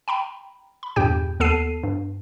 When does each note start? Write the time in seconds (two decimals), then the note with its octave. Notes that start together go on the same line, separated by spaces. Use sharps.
0.08 G5 A#5 B5
0.83 B5
0.96 E2 G2 A#2 G4 G5 G6
1.40 D#2 B3 A4 A5 C7 D#7
1.83 G2